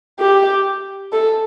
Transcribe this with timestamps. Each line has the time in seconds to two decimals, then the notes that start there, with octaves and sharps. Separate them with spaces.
0.20 G4
1.13 A4